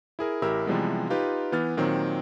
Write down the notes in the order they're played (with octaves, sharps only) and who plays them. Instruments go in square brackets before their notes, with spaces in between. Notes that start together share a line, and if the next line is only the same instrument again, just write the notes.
[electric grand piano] E4 G#4 A#4
A1 E4 G4 A#4 E6
C3 E3 F3 G3 G#3 B3
D#4 F4 G4 B4
E3 B3 F6 A6
A#2 D#3 F#3 C4